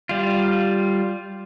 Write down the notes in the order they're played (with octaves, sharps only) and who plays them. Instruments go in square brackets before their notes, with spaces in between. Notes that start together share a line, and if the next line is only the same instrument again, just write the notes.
[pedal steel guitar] G3 F4